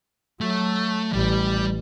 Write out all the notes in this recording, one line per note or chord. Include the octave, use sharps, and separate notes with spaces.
F#3 A3
A1 G3